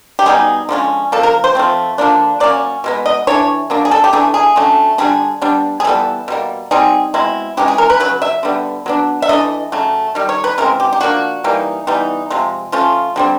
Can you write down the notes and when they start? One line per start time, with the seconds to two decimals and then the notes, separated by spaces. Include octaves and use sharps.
0.19 G4
0.26 B2 G3 B3 D#4 G#4
0.69 D3 F3 G#3 C#4
1.12 C#3 F3 A#3 A4
1.23 A#4
1.44 C5
1.55 F3 A3 C4
1.98 D3 F3 A#3 D4
2.40 F#3 A#3 C#4 D5
2.84 B2 G#3 B3
3.06 D#5
3.27 E3 A3 D4 C#5
3.70 F#3 A#3 D4
3.85 G#4
3.91 A4
4.04 G4
4.13 E3 A3 D4 G#4
4.34 G#4
4.56 D3 F#3 A3 C#4
4.98 D3 G3 B3 D4 G#4
5.42 G3 B3 D4
5.80 G#4
5.84 E3 G3 B3 A4
6.28 B2 G3 A#3
6.71 G3 C4 D#4 G#4
7.14 B2 G#3 C4 E4
7.57 E3 G#3 C#4 E4 G4
7.68 G#4
7.78 A#4
7.90 B4
8.00 C#3 F#3 B4
8.22 E5
8.43 D3 G3 B3
8.86 F#3 B3 D4
9.22 E5
9.29 E3 A3 D4 D#5
9.72 C#3 F#3 A3
10.15 D#3 G3
10.29 C#5
10.44 B4
10.58 C#3 E3 G#3 C4 A#4
10.80 G4
10.93 G4
11.01 F3 A#3 D4 F#4
11.44 E3 G3 A#3 D#4
11.87 E3 G3 B3 D#4
12.30 C3 F3 G#3
12.72 F3 A3 C#4 F4
13.16 D3 G3 C4